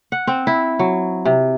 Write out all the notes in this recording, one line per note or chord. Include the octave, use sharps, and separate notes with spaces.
F#5
C4
E4
F#3
C3